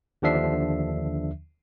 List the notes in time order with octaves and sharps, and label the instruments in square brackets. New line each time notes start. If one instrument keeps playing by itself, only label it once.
[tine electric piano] D#2 D3 F3 D4 E5 C7